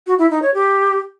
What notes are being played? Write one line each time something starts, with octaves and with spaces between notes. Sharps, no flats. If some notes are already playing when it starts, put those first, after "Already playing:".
F#4
E4
D#4
C#5
G4